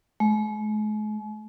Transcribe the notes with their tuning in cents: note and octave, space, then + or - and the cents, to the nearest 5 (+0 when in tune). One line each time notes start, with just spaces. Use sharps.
G#3 +45